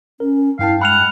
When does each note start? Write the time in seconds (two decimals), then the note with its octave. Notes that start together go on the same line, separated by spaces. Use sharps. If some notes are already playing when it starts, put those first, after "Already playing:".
0.20 C#4 A#4
0.59 G2 E4 F5 G5 A5
0.81 G#3 F#5 B5 F6 F7